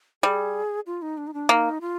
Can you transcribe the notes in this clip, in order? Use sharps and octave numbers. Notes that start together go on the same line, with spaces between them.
G3 G#4
F4
D#4
D4
D#4
D4
A#3 D#4
F4